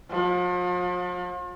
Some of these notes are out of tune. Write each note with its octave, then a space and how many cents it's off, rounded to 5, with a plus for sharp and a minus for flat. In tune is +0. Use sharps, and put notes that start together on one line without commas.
F3 +40